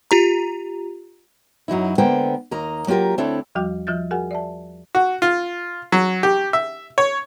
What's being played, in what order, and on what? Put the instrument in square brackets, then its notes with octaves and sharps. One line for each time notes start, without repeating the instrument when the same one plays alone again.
[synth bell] F4 G4 A#5
[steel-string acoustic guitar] F#2 F#3 D#4 E4
D3 G#3 A#3 B3 C5 G5
D#2 A#3 D#5 A#5
F#3 A#3 F4 G4 A#4
D2 C4 D4 E4 A4 C#5
[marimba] E2 F3 G3 F#4 G5 D6
F3 F4 E5 F6 G6 A6
F#4 G#4 A#4 F#5 G#5
D5 E5 A5
[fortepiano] F#4
F4
F#3
G4
E5
C#5